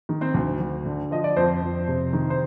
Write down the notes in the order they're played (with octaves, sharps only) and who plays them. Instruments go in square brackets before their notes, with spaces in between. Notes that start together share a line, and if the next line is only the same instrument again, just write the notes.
[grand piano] D#3
C4 C5
D2
D2
D3
F3 D#5
D5
F2 C4 C5
F2
C3
D#3
C5